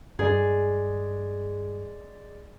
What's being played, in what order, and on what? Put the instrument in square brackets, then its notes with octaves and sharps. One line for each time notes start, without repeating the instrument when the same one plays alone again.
[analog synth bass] G2 [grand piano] G#3 D5 [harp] G#4